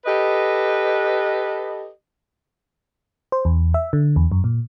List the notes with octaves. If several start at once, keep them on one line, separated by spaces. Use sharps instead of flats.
G4 A4 B4 D#5
C5
E2
E5
D3
E2
F#2
A#2